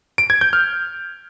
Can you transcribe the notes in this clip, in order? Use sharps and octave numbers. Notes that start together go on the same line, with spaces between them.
D7
G#6
G6
F6